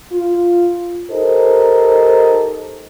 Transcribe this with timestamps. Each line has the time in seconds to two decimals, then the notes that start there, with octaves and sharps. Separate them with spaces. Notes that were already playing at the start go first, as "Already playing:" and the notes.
0.12 F4
1.11 D#4 G4 A4 A#4 C5 D#5